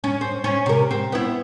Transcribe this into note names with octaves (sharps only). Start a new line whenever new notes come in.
C#4
C4
C#4
C3 A#4
C4
B3 E4